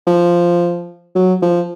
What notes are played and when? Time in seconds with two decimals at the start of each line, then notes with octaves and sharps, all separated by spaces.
0.07 F3
1.15 F#3
1.42 F3